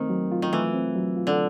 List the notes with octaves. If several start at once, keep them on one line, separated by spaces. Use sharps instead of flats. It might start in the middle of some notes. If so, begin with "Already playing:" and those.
Already playing: D#3 A3 C4
F#3
F4
D#3
E3 A3
C4
F#3
F4
D3